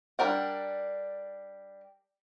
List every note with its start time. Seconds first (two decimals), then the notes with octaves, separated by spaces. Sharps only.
0.19 G3 D4 A#4 F#5